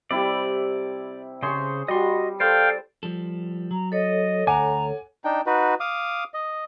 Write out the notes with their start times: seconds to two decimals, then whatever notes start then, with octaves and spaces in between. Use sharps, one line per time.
0.11 C3 G3 E4 D5
1.43 C#3 G#4 C5 C#5 C6
1.88 G3 F#4 D#5 C6
2.40 A4 C5 D5 F5 G5
3.03 F3 G3 A4
3.71 F#3 A#5
3.92 A4 C#5 D#5
4.47 D2 F#5 G#5 A#5 D6
5.24 D4 D#4 G5
5.46 D#4 F#4 B4
5.80 F5 D6 D#6
6.34 D#5